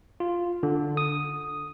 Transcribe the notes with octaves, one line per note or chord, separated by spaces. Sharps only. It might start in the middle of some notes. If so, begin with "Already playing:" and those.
F4
D3
D#6